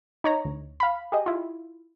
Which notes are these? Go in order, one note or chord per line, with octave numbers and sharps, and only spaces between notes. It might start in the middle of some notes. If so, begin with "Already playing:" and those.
D#4 C#5 A#5
D2
F5 B5
G4 G#4 D#5
E4 F4